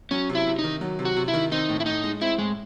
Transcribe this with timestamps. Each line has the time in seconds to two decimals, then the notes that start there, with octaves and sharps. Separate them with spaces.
0.11 F#3 C#4
0.29 C3
0.35 E4
0.47 C3
0.59 D#4
0.64 D#3
0.81 F#3
0.99 C3
1.05 F#4
1.17 C3
1.28 E4
1.34 D#3
1.51 C4 D#4
1.69 A2
1.80 E4
1.86 A2 D#4
2.03 G#3
2.21 C4 E4
2.38 A2 G#3